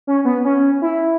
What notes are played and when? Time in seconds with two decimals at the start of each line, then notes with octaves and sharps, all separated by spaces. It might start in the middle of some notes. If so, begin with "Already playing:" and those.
0.07 C#4
0.25 B3
0.44 C#4
0.82 E4